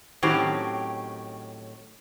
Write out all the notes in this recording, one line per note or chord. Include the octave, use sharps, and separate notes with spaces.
A2 D#3 F#3 C4 C#4 G4